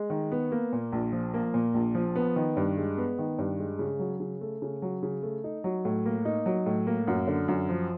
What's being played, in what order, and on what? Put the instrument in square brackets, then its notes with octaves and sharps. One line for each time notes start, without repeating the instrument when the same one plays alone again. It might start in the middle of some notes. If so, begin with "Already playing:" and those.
Already playing: [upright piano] G#3
D#3
B3
A#3
A#2
A#1
F3
A#3
A#2
A#1
F3
B3
D#3
G2
G#3
B3
D#3
G2
G#3
C#3
F#3
C#3
A3
C#3
F#3
C#3
A3
D#4
F#3
A2
A#3
D#4
F#3
A2
A#3
F#2
D3
F#2
F3